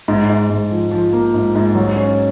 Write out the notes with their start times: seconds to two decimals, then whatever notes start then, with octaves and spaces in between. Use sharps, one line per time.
0.08 G#2
0.29 G#2
0.50 G#2
0.71 F3
0.91 F3
1.13 A#3
1.34 G#2
1.55 G#2
1.75 F#3
1.96 C#4